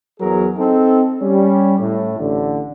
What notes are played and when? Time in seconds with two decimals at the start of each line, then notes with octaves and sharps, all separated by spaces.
0.19 E2 F#3 G#4 A#4
0.57 C4 D#4 A4
1.20 G3 C#4
1.79 A2
2.18 A1 D3